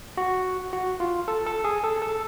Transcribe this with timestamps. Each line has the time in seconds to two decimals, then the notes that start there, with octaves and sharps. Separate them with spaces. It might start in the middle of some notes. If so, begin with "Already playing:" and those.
0.17 F#4
0.73 F#4
1.00 F4
1.28 A4
1.46 A4
1.64 G#4
1.84 A4
2.02 A4